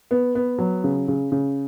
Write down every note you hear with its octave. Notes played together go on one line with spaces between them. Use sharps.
B3
B3
F#3
C#3
C#3
C#3